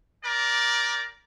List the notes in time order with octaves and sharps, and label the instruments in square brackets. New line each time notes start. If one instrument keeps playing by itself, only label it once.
[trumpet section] G4 A#4 D5